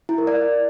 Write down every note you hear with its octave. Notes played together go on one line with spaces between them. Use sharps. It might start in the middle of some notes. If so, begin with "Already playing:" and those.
E4
A#4
D5